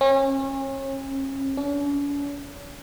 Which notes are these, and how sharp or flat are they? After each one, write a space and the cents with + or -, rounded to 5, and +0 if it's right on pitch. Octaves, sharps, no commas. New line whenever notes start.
C#4 -35
C#4 +45